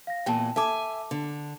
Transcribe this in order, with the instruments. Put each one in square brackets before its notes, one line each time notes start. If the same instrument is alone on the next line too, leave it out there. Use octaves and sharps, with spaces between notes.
[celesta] F5 A#6
[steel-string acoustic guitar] E2 A#2 E3 [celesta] G5 A5
[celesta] A4 A5 D6 [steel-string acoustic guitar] E5 G#5
[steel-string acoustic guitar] D3